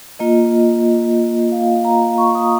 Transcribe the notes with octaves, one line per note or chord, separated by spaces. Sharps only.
A#3 F4 D#5
F5
A#5
C#6
D#6